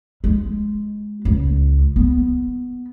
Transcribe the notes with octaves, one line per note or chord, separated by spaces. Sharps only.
G#3
C#2
B3